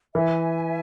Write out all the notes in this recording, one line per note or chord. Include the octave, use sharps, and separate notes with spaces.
E3 E5 G#5